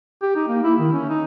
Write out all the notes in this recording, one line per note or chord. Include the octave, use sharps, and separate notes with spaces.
G4
D#4
A#3
E4
D#3
C#4
D#4